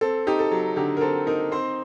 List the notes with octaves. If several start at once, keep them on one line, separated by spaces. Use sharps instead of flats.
C4 A4
D#4 G4
A4
F#3
D3 G4
A#4
C4 A4
D#4 A#4
C4 C5